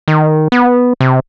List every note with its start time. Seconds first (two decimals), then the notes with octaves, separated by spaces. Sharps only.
0.08 D#3
0.52 B3
1.01 C3